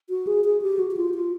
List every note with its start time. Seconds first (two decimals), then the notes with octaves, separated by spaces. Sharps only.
0.10 F#4
0.27 G#4
0.45 G#4
0.62 G4
0.79 F#4
0.91 F#4
0.97 F4
1.14 F4